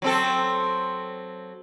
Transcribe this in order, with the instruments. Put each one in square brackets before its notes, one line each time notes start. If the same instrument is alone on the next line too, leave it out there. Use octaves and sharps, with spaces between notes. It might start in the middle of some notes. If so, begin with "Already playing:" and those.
[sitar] F#3 C4 A4